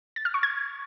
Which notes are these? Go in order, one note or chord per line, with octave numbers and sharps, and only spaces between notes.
A6
F6
C#6
G#6